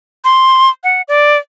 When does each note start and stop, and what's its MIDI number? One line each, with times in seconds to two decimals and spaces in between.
0.24 0.70 84
0.84 1.02 78
1.08 1.37 74